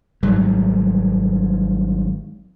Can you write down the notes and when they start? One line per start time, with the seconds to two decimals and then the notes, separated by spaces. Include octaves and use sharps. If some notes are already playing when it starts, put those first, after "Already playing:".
0.23 G#1 G#2 F#3 G3